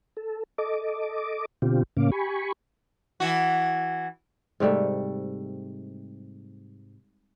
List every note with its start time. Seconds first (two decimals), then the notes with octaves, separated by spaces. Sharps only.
0.17 A4
0.58 A4 D#5 D6
1.62 B2 D3 C4 F4 G4
1.97 A2 C#3 A#3 C#4 F5 D6
2.11 G4 G#5 B5 C#6
3.20 E3 F#4
4.60 G#2 C3 G3 A3